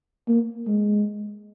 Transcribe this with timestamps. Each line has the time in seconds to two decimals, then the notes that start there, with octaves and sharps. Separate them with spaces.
0.28 A#3
0.68 G#3